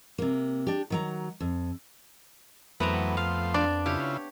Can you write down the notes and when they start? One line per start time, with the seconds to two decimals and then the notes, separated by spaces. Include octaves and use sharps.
0.18 C3 A#3
0.67 D4 G4
0.90 D#3 F#3 A#5
1.40 F2
2.80 F2 E3 F#3 A3 B3 C4 A#5
3.17 F3 A3 F5 C6
3.54 D4 D5
3.86 C#3 E4 F4 G4 C#5